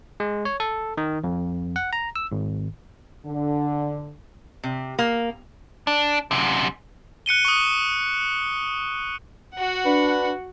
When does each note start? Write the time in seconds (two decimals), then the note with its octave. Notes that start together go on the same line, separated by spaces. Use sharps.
0.20 G#3
0.45 C#5
0.60 A4
0.97 D#3
1.24 F2
1.76 F#5
1.93 A#5
2.16 E6
2.32 G#1
3.25 D3
4.64 C3
4.99 A#3
5.87 D4
6.31 F#2 C3
7.26 F#6 C#7 D#7 G7
7.45 C#6 D#6
9.54 F#4 F#5
9.85 D4 B4